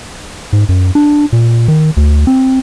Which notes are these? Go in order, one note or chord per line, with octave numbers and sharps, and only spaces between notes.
G#2
F#2
D4
A#2
D#3
D2
C4